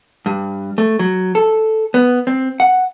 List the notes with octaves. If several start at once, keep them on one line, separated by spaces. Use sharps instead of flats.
G2
A3
F#3
A4
B3
C4
F#5